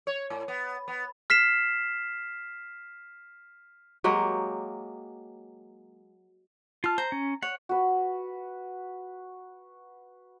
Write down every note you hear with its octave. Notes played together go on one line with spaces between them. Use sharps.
C#5
A2
B3
B3
F6 B6 C7 E7
F#3 G#3 A#3 G4
F4 A5 F6
C5 A#5
C#4
C#5 F#5
F#4 B4